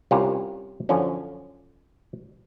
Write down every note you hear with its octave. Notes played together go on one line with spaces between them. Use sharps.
C2 C#4 F4 G4 A#4 A#5
F#2 D3 F3 C#4